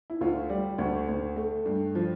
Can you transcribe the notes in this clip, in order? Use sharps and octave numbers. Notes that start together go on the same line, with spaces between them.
E4
D2 F4
G3 G4
D2
D2
A3
G2
F3